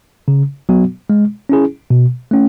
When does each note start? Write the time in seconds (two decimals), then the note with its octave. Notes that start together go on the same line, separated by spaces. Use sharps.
0.28 C#3
0.69 F#3 B3 F#4
1.10 G#3
1.49 C#4 E4 G#4
1.90 B2
2.31 A3 C#4